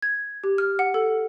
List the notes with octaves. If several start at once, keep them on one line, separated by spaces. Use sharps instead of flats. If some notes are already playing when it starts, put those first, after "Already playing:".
G#6
G4
F6
F#5
A4